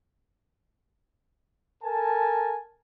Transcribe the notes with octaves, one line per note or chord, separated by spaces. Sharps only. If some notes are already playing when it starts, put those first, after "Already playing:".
A4 A#4 G#5 A5